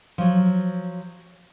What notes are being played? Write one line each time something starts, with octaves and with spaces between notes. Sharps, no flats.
F3 F#3